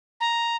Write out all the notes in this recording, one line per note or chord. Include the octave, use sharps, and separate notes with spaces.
A#5